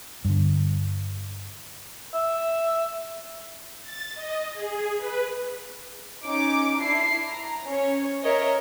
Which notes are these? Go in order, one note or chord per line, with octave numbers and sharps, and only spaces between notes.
G2 D3
E5
A6
D#5
G#4
B4
C#4 D#4 D6
D4 E4 C7
A#5
C#4 C#5
A#4 C#5 D#5 E5